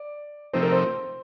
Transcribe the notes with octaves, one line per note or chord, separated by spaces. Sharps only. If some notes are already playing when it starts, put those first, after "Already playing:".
Already playing: D5
C3 F3 A3 C4 D#4 C5
A#4
C5